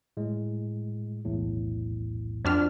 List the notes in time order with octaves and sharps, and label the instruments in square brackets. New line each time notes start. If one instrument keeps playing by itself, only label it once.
[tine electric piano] A2 G#3
B1 E2 A2
[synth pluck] F2 D4 F6 [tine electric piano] F#4 D5